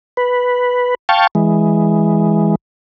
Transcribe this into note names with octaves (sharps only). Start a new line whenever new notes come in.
B4
F5 G5 A5 C#6
E3 G#3